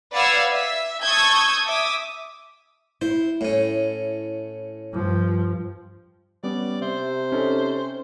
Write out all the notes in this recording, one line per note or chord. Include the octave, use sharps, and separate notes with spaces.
B4 D5 F5 F#5 E6 G#6
E5
A5 C#6 D#6 E6 G6 G#6
E5 D6 D#6
E4 C5
A2 C#4
G2 F3
G3 B3 C#4 D5
C3 C5 E5
C#4 D#4 A4